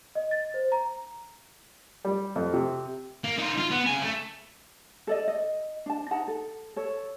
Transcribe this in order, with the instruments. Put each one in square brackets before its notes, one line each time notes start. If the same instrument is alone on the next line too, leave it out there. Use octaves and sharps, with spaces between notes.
[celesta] D#5
A6
C5
A#5
[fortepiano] G3
F2
C3
[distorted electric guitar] A#3
D#4 F4
F4
B3
C#3 G#5
A3
[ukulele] A4 D5 D#5
D#5
D4 A5
D#4 F#5 A5 A#5
A4
A4 C#5